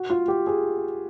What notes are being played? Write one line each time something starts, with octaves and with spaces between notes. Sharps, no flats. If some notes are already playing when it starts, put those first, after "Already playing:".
Already playing: F#4
F4
G4
G#4